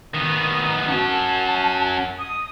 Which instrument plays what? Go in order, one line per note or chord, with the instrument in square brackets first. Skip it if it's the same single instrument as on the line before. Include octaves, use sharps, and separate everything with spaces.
[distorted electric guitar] D#3 B3 [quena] D#6
[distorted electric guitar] C#4 F#4 [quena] A5
[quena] D#6